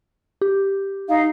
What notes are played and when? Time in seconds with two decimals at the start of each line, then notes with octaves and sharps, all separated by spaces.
0.41 G4
1.09 D#4 F5